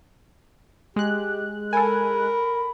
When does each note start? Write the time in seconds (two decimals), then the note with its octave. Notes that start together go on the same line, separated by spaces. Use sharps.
0.96 G#3 G4 F#6
1.73 A4 A#4 G#5 B5